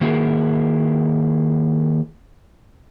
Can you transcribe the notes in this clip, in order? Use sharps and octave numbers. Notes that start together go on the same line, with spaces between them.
D#3 A#3 E4 F#4 G#4 A#4